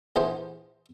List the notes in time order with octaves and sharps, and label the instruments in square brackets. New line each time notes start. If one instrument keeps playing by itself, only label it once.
[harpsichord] A#1 E3 B3 C5